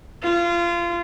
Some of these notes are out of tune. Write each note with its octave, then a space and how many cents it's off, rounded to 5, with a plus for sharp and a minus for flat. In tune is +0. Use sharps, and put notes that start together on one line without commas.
F4 -25